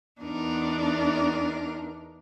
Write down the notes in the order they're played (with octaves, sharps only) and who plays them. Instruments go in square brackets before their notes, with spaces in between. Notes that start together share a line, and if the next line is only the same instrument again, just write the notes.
[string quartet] E2 D4 D#4 A#4